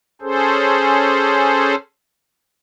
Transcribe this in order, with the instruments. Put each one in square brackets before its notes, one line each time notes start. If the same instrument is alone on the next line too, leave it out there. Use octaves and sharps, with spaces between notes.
[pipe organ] C#4 G#4 A4 C5